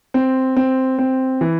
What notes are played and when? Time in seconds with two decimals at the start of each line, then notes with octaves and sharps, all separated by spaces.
0.14 C4
0.57 C4
0.99 C4
1.41 E3